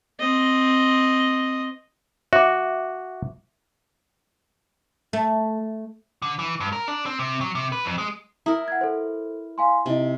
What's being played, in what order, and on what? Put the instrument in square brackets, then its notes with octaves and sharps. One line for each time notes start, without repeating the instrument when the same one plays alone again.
[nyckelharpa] C4 D#5
[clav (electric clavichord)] F#4 [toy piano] E5 D6
[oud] A3
[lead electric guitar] D3
E3
G2
A#4
D4
C4
C3
F#3
C3
B4
F2
G#3
[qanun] E4 A#4 [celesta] A#5 D#6
[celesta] F#5 G#6
A4 C5
F5 G#5 C6
[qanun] C3 [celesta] D#4 E4 D#5